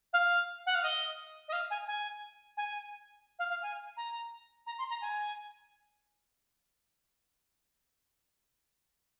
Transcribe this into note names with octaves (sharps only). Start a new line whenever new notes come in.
F5
F#5
F5
D#5
D#5
F5
G#5
G#5
G#5
F5
F5
G#5
A#5
A#5
C6
A#5
G#5